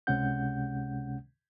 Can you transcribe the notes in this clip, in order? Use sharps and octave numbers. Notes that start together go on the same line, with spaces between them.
C#2 C3 G#3 C#4 F#5 G6